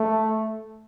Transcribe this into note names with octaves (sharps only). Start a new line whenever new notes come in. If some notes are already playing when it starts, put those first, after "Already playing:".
Already playing: A3